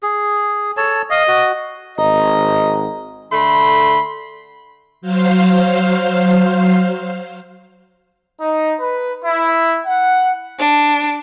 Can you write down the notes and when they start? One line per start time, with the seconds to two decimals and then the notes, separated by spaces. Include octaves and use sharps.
0.03 G#4
0.77 A4 C#5 A5
1.11 D#5 F5 D#6
1.28 F#4
1.98 G#1 D#5 A#5
3.32 D3 A3 B5 C6
5.01 F#3 C5 F5
8.41 D#4
8.80 B4
9.24 E4
9.87 F#5
10.59 D4